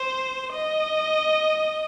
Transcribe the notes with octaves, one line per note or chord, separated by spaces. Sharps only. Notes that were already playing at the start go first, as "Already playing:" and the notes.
Already playing: C5
D#5